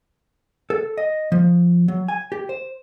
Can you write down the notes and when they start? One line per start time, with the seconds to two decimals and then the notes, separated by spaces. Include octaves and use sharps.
0.70 A4
0.97 D#5
1.32 F3
1.88 F#3
2.08 G#5
2.32 G4
2.49 C5